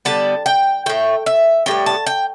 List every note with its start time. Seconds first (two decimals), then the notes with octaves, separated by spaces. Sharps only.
0.05 D3 G3 B3 A5
0.46 G5
0.86 A2 A3 G5
1.26 E5
1.66 A2 G3 B3 G5
1.86 A5
2.06 G5